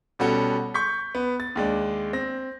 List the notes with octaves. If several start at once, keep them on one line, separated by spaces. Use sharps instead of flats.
B2 G3 C#4 F#4 A4
C#6 G6 B6
B3
A6
D#2 G#3 D4
C4 A#6